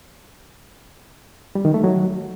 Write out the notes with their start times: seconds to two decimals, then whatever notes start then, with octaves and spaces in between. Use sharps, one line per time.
1.55 G3
1.65 D#3
1.74 A3
1.84 F#3